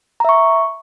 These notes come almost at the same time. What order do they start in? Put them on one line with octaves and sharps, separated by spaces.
A#5 E5 C#6